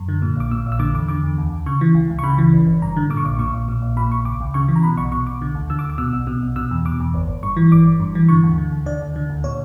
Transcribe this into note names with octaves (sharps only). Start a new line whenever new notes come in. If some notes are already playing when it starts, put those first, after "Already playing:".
Already playing: F#2
D3
A#2
A#1 D6
A#2 E6
A#1
E6
D3 D6
E2 D6
D3 D6
E2
D2
D2
C#3 C#6
E3
C#2
C#2
C#6
C#3 B5
E3
G1
G1
G2 A#5
D3
A#2 D6
C#6
A#1 D6
A#2 C#6
A#1
A#2
A#1
A#2 B5
A#1 C#6
C#2 D6
C#2
C#3 C#6
E3
A#5
B2 B5
B1 C#6
B2 C#6
B1 D6
D3
D2
D3 E6
D6
D2
D6
B2 E6
B1
B2
B1
B2 E6
E2
B2 D6
E2
G1
G1
G2 C#6
E3
G1 D6
G1
G2
E3
D3 C#6
D2
D3
D2
D3 D5
D2
D3
D2
A#2 C#5